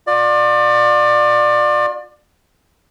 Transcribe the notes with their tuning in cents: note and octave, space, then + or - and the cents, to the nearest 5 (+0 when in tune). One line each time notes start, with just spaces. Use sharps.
F4 +40 D5 +25